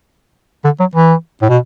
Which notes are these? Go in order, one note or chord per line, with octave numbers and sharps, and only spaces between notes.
D3
F#3
E3
A2
B2